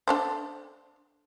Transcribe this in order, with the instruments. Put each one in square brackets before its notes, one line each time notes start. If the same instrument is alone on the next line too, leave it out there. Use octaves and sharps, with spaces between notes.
[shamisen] D4 A4 C5